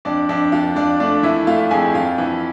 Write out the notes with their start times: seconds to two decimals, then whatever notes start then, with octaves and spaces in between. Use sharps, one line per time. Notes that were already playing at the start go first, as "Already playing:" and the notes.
0.05 F2 D4 D5
0.29 F2 D4 D5
0.52 F2 F4 F5
0.76 F2 D4 D5
1.00 A3 D4 D5
1.23 E3 E4 E5
1.47 A3 F4 F5
1.71 F2 G#4 G#5
1.94 F2 F4 F5
2.18 E3